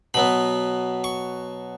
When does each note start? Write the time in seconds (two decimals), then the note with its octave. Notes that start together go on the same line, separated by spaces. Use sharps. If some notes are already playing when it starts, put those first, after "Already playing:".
0.14 B2 F#3 B3 B5
1.04 C#6